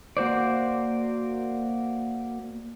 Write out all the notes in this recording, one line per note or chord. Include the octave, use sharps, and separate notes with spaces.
A#3 F#4 C5 D5